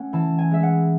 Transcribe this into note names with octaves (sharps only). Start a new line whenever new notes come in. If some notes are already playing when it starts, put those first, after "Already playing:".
Already playing: A3 C#4 F#5
E3 A5
G#5
G#3 E5
F#5